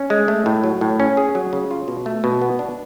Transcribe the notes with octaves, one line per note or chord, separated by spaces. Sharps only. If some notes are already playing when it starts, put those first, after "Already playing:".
Already playing: C#4
G#3
A3
A2
F#3
A2
C#4
G#4
F#3
C#3
F4
B2
A3
B2
B3
D4